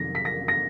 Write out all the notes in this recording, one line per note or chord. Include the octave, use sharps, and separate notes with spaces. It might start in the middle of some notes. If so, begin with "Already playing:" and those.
Already playing: F2 C3 D#3 F#3 A#6
B6
A#6
A#6